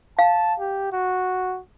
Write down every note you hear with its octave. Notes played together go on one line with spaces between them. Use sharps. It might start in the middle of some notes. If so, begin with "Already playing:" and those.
F5 A5
G4
F#4